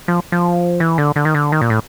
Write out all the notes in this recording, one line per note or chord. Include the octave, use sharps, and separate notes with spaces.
F3
F3
E3
D3
D3
D#3
D3
D#3
A#2
A2